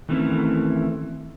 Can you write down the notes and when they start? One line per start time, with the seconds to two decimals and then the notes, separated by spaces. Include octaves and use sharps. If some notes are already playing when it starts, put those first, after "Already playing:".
0.09 D#3 E3 A3 C4 C#4 E4